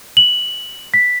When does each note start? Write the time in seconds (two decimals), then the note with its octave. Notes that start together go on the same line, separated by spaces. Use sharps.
0.17 F#7
0.94 B6